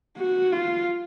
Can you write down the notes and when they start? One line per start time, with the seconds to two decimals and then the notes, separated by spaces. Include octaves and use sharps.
0.18 F#4
0.52 F4